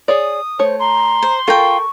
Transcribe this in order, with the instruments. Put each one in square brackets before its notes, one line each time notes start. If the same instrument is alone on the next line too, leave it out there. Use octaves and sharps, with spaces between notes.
[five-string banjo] G#4 C#5 D5 [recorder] D#6
[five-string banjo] A3 C#5 [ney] C5
[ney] A#5 [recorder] C6
[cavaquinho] C5
[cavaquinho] F4 G5 [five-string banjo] A4 A#4 [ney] C#6